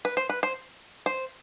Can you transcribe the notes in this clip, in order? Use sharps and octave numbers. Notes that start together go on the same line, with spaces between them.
B4
C5
B4
C5
C5